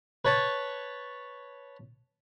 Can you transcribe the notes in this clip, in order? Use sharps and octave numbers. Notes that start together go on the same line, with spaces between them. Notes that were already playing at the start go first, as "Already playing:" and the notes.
B4 C#5 A5